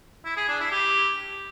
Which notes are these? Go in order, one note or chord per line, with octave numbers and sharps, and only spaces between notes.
E4
G#4
D4
E4
G4